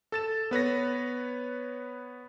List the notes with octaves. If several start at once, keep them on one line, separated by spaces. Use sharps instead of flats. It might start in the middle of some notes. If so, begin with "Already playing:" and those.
A4 A6 E7
B3 B4 C#5 A#6